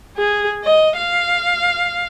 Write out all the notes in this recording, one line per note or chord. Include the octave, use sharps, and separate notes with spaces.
G#4
D#5
F5